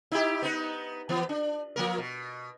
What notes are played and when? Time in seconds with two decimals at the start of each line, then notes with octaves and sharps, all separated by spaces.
0.12 D#4 E4 G4
0.42 B3 D#4 B4
1.09 E3 B3
1.29 D4
1.76 F3 A#3 A#4
1.98 B2